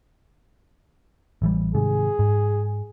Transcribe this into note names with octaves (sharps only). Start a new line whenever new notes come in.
A1 E3 G3
G#2 C3 D#3 G#4
G#2